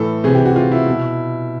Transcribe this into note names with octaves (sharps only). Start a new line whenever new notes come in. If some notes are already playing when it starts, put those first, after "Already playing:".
Already playing: A2 E3 A4
C3 E3 G#4
G4
F#4
F4
E4
B2